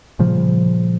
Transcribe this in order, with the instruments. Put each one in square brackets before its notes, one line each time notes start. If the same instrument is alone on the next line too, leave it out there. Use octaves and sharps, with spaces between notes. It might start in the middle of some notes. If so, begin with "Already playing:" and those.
[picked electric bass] A#2 C#3 F3 G3